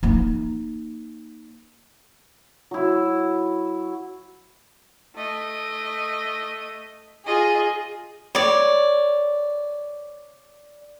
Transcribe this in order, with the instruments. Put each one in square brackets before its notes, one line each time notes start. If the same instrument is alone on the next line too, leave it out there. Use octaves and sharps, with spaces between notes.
[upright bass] A#3 D#4
[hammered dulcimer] F#3 E4
[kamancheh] A3 D#5
[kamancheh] F4 D#5 [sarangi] G#4
[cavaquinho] C#5 D5